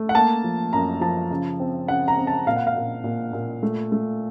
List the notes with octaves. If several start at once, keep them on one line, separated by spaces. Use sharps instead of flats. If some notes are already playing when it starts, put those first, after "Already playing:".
Already playing: A3
F#5
A#3 A5
F3
F#2 A#5
F3 A5
C#3
C4
C#3 F#5
A#5
C4
A5
A#2 F5
F#5
F5
A#2
A#2
A#2
A3
A3